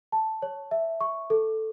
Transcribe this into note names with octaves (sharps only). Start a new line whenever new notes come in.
A5
C#5
E5
C#6
A4